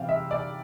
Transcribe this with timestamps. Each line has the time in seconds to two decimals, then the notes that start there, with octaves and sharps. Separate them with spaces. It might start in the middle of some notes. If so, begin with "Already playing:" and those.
Already playing: C3 E3 G3 C4 F5
0.09 E5
0.31 D5